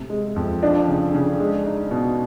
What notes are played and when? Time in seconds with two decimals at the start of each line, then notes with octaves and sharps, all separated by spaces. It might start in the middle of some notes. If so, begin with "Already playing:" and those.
Already playing: A2 C3
0.10 G#3
0.36 F2
0.63 F3 D4
0.88 C#3
1.14 C#3
1.40 G#3
1.66 D#4
1.91 B2